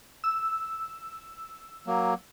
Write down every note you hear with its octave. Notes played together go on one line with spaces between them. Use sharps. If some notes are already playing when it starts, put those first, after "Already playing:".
E6
F#3 A#3